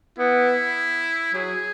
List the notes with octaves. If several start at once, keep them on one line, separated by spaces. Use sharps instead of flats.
B3 E4
F#3 G#4